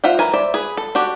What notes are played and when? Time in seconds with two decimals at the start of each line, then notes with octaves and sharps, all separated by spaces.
0.04 F4 C5 E5 F#5 G5
0.19 E3 A#4 G#5
0.34 C5 D5 E5
0.54 G#4 B4
0.77 A4
0.95 D4 F#4 G4